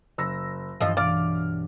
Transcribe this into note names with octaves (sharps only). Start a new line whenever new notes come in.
F#1 E6 A#6
G2 E3 F3 D#5 E6
B1 D5 F5 D6 F6